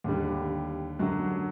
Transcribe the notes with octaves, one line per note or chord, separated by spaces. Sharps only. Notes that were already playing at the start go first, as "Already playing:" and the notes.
D#2 D3 G3
F#2 D3 F#3